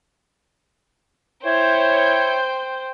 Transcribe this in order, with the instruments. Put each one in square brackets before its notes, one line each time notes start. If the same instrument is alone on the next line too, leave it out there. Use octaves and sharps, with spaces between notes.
[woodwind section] E4 C#5 [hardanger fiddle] C5 G5